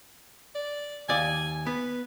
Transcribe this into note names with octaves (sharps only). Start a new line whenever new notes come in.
D5
D#2 D5 G#5
B3 B4